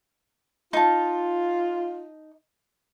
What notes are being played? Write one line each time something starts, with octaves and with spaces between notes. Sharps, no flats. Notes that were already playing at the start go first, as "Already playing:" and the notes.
D#4 F4 A5